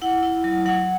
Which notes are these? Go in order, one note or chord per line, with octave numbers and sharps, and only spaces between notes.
E4 F#5
E4
F#3
F#3 F#5